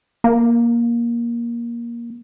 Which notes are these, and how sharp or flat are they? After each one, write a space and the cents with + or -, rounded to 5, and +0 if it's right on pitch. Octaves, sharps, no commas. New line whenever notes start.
A#3 +15